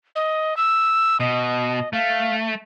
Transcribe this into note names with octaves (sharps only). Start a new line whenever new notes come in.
D#5
E6
B2 D#5
A3 F5